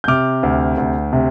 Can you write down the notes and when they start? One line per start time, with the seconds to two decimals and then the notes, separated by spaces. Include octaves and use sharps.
0.04 G6
0.08 C3 D6 F6
0.43 D2
0.78 D2
1.13 C3